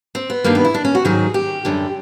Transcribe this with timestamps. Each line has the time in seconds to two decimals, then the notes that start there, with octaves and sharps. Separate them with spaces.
0.15 C4
0.30 B3
0.44 G2 D#3 G3 A#3
0.55 B3
0.65 E4
0.74 D4
0.85 C#4
0.95 F#4
1.05 G#2 D#3 F#3 G#4
1.34 G4
1.65 F#2 D3 G3